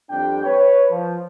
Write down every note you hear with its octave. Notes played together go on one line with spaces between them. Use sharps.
F2 G3 D4 G5
B4 C#5
F3